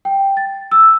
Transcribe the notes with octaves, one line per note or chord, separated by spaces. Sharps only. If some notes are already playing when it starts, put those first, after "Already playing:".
G5
A6
E6